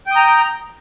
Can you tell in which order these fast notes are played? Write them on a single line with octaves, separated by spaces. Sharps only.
G5 D#6 A#5